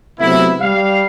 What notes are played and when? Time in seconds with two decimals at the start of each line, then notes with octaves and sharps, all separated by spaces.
0.20 C3 F#3 A3 B3 E4
0.61 G3 F5